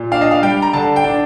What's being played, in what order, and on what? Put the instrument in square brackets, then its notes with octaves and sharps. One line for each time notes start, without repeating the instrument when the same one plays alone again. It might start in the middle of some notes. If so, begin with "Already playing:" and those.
Already playing: [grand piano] A#2
D4 F5
D#5
F5
G3 G5
A#5
D3 A5
G5
D4